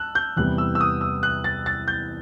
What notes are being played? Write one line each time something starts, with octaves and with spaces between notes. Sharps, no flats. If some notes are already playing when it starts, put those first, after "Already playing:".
Already playing: A5 E6 F#6
G6
E2 C3 E3 G3 B3 F#6
E6
E6
D#6
E6
F#6
A6
A6
G6